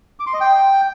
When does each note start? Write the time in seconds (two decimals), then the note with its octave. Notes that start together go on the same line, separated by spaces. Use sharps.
0.20 D6
0.27 C6
0.34 D#5
0.41 G5